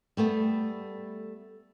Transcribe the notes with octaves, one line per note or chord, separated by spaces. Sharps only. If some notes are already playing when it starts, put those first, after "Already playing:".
G3 A3 B3